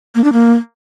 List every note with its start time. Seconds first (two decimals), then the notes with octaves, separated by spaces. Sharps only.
0.15 A#3
0.24 D4
0.33 A#3